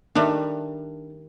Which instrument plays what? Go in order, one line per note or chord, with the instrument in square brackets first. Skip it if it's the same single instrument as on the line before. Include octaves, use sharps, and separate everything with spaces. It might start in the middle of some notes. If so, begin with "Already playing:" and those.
[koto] D#3 G3 A3 [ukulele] D4